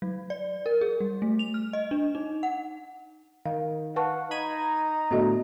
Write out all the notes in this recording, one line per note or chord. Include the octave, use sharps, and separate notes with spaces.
F#3
D5
A#4
G#4
G3
A3
F7
F6
D#5
D4
D#4
F#5
D#3 F5
B4 F5 F#5 A5 C#6
D#4 A#5 B5 G#6 D#7
A2 D3 A3 B3 F#4 D#5